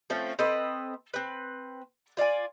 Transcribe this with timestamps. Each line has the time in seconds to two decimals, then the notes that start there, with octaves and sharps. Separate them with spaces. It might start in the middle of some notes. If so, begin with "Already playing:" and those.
0.10 F3 A3 C4 C#4
0.39 C4 A4 B4 D#5
1.14 C4 B4
2.17 F4 D5 F5 G#5